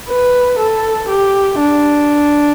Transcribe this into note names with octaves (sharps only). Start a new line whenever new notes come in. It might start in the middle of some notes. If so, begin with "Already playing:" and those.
B4
A4
G4
D4